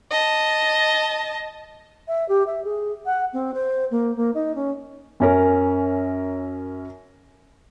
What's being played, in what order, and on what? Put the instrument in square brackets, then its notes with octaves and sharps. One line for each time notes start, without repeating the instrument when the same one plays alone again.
[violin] D#5 A5
[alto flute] E5
G4
E5
G#4
F#5
C4
C5
A#3
A#3
D#4
C#4
[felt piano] F#2 C#4 A#4